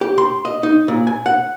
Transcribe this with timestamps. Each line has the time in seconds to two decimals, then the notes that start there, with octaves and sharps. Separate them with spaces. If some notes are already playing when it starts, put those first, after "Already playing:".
0.01 G4
0.18 C6
0.45 D#5
0.63 D#4
0.88 A#2
1.07 G#5
1.26 F#5